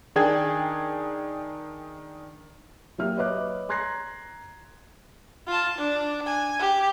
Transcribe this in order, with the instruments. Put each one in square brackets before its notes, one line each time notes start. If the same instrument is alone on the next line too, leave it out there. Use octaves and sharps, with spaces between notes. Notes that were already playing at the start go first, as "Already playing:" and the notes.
[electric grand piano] D#3 D4 G#4 G5 G#6
[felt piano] F#3 A#3 G4 E5 F6
B4 C#5 D#5 E5 D6 F#6
A#5 C6 F#6 G#6 A#6 C7
[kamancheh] F4 A5
D4
G#5
G4